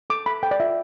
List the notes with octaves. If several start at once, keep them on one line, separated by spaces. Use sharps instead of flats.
A4 D6
A4 B5
A4 G5
D5
F4 E5